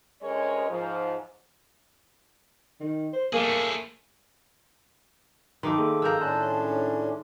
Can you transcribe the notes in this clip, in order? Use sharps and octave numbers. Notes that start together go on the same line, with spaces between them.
D2 G#3 C#4 A#4 C#5 D#5
G#2 F3
D#3
C5
A3 A#3 G#4
D#3 A3 C6 D6
A#3 G#4 A4
G#3 A#3 A#4 E6 G6 A#6
A2 C#4 D4 A5 C6 F#6
C6